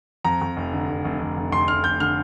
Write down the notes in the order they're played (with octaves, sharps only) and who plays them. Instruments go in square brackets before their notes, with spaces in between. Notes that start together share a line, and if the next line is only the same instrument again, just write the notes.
[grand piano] F2 A#5
F2
F1
D3
F1
F1
F1
F1
F1 C6
F1 F6
F1 G6
D3 F6